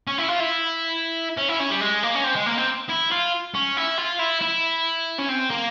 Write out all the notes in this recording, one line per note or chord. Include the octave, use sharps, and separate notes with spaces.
C#4
E4
F4
E4
C#4
E4
C#4
G3
G#3
A#3
C#4
C4
G#3
A#3
C4
E4
F4
C#4
E4
F4
E4
E4
C#4
C4
A#3